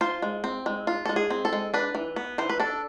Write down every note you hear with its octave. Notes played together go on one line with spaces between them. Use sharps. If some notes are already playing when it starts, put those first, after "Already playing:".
F4 C5
G#3
C4
G#3
F4
G#3 A4
G#4
C4
A4
G#3
D4 B4
E3
B3
E3 C5
B4
D4 A4